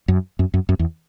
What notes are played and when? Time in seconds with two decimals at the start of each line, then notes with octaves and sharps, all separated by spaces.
0.08 F#2
0.39 F#2
0.54 F#2
0.69 F#2
0.79 E2